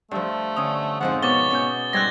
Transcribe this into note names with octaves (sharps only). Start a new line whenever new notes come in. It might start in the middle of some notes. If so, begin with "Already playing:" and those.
G2 F3 A3
D3 C#4 D#6
F2 G#2 F3 F#5
B2 B3 C#5 D6 A6 G7
B2 C#4 G6
G#2 G3 C4 F#6 G#6 A#6